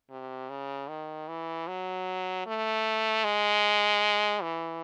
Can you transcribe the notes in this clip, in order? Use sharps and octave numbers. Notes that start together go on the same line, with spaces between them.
C3
C#3
D#3
E3
F#3
A3
G#3
E3